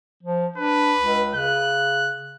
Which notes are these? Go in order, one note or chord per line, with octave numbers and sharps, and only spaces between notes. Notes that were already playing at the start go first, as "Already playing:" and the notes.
F3
D4 B4
C#2
C#3 F#6